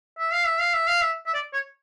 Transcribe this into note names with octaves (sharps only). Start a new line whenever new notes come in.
E5
F5
E5
F5
E5
F5
E5
E5
D5
C#5